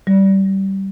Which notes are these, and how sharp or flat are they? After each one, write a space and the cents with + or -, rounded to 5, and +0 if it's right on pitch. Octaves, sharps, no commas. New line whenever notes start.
G3 -20